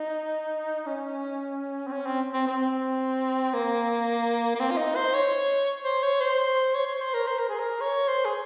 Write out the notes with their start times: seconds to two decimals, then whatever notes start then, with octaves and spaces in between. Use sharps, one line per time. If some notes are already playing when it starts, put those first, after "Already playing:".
Already playing: D#4
0.86 C#4
1.87 C4
1.93 C#4
2.06 C4
2.33 C4
2.47 C4
3.54 A#3
4.55 A#3
4.60 C4
4.71 F4
4.77 D#4
4.96 C5
5.14 C#5
5.84 C5
6.03 C#5
6.20 C5
6.74 C#5
6.87 C#5
7.01 C5
7.14 A#4
7.27 C5
7.39 A#4
7.49 G#4
7.59 A#4
7.81 C#5
8.08 C5
8.25 G#4